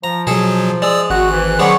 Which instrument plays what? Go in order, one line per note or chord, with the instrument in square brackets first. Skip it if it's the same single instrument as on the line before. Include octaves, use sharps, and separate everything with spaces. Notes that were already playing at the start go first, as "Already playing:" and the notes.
[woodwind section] F3 [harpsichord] A#5
[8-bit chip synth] B2 F#3 [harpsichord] G#4 A4
[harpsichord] G#3 [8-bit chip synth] D5 D#6 E6
[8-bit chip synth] G#1 F#6 [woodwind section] F#4
[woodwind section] G#2 E3
[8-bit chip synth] D#3 F#3 G#4 [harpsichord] B3 C#4 D5 [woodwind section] C5 C#6